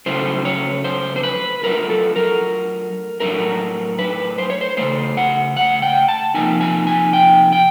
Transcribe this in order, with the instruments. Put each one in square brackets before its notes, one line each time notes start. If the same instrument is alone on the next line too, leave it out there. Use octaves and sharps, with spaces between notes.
[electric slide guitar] C#3 F#3 A3 C#4 E4 C5
C#5
C5
C5
B4
F#3 A3 D4 F4 A#4
A4
A#4
A2 F#3 A3 D4 A#4
B4
C5
C#5
C5
C#3 E3 A3 C5
F#5
F#5
G5
A5
C3 F3 A#3 D#4 G#5
G#5
G#5
G5
G5